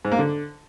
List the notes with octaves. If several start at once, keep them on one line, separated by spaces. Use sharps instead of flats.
G#2
A#3
D3